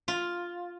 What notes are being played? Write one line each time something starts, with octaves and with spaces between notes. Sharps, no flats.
F4